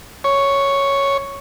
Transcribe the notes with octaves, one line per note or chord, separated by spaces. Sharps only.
C#5